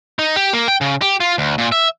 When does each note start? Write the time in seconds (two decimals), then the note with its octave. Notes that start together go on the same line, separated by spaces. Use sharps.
0.19 D#4
0.36 G4
0.53 A#3
0.68 G5
0.81 C#3
1.02 G4
1.20 F4
1.38 D2
1.58 A#2
1.72 E5